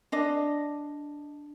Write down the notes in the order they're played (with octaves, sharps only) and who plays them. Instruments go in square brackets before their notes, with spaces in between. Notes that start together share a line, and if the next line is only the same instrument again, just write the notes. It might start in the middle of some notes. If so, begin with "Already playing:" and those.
[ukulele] D4 D#5